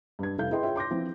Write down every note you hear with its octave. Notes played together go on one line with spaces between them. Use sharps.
G2 G#6
F1 G2 E4 A4 F5 G6
E4 G#4 B4 D#5 G5 C6
F4 G#4 C#5 E5 G5
C6 D6 G6 A#6
E3 F3 C4 E4